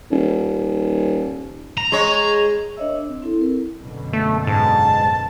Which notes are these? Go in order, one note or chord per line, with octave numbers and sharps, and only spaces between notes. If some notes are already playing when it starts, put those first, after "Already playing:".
D#1
A#5
G#3 C#5
D4 A#4 C#5 D#5 E5 E6
D4
C4
C4 E4 A4
A#4
F#2 B2 D3
A3
G#2 A5